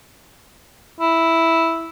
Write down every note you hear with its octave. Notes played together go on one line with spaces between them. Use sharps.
E4